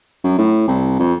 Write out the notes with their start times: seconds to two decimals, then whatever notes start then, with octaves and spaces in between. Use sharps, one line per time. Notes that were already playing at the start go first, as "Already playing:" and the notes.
0.24 F#2
0.38 A2
0.68 C2
0.99 F2